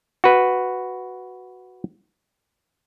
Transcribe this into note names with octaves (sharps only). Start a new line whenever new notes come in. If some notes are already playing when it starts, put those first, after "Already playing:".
F#4 B4